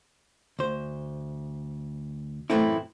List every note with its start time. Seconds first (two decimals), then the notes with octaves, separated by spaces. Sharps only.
0.59 D2 C5
2.50 F#2 A2 E3 A3 C4 E4